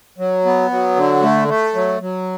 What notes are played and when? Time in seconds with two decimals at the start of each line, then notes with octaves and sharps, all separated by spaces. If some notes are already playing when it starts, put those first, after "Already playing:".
0.18 F#3
0.45 B3
0.71 F#3
0.96 D3
1.22 A3
1.48 A3
1.75 F#3
2.01 F#3